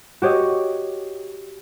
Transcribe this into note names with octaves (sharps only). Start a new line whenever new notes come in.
F#4 G4 C#5 D#5